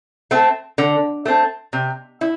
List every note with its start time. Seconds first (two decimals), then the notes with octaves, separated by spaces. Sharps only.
0.31 A3 C4
0.78 D3
1.25 A3 C4
1.73 C3
2.21 E4